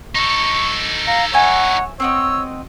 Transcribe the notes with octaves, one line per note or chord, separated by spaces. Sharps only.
D#4 A4 C#6
F5 A#5
C#5 E5 F#5 G#5
C4 F#4 C#5 D#5 E6